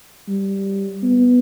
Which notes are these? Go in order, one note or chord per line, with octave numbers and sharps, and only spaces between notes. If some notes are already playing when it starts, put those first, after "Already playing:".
G3
B3